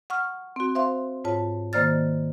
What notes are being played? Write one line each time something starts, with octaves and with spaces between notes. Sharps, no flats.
F#5 C#6 F6
C4 F#4
C5 E5 F5 C6
G#2 F4 C#5 A5
D#3 A#3 C5 D5 F6 A6